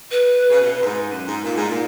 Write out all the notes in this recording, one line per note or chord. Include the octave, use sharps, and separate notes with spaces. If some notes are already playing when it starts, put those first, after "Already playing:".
B4
C#3
B2
F#2
G#2
F#2
G#2
A#2
G#2
A#2